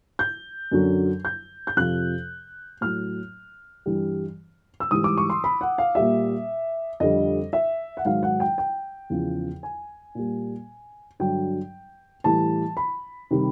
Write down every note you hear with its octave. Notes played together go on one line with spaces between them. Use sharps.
G6
F#2 D3 F#3
G6
G6
F2 C3 F3 F#6
A2 F#3 F6
G2 E3 G3
E6
G#2 E3 G3 D#6
D6
C#6
C6
B5
F#5
F5
A#2 G3 E5
F2 D3 G3 D#5
E5
F#5
G#2 D#3 F#3 F5
F#5
G5
G5
E2 C#3 F3
G#5
A#2 G3
G2 D3 F#3 G5
A2 E3 G3 A5
B5
C3 D#3 G3